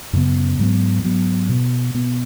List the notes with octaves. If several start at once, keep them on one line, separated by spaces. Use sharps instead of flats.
F#2 C#3 B3
G#2 F#3 B3
G#2 F#3 B3
B2 B3
B2 B3